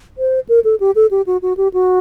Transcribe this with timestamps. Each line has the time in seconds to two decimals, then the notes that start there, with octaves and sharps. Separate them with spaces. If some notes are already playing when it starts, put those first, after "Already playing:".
0.18 C5
0.49 A#4
0.64 A4
0.80 G4
0.96 A4
1.11 G4
1.27 F#4
1.42 F#4
1.57 G4
1.74 F#4